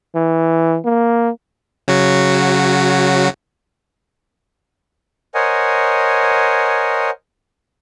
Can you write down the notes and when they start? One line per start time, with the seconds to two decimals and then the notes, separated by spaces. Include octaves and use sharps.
0.16 E3
0.85 A#3
1.88 C#3 F#3 F#4
5.35 A#4 C5 C#5 D#5 F#5 G#5